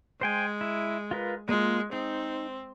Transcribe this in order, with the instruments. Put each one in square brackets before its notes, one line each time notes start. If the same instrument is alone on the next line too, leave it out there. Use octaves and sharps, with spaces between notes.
[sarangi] G#3 [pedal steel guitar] C5 G5 G#5
[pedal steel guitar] E4
F4 A#4 B4
[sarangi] G#3 [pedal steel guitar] A#3 F4
[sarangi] C4 [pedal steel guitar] D#4